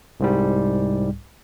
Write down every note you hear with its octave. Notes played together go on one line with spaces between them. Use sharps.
C2 G#2 G3